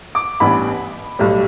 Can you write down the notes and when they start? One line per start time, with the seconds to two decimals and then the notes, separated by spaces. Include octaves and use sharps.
0.15 D6
0.40 A1 G2 E3 B3 D4 B5
1.19 B1 A2 G3